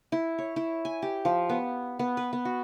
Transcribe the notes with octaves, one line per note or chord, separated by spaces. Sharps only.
E4
C#5
E4
G#5
G4
F3
B3
B3
B4
B3
F#4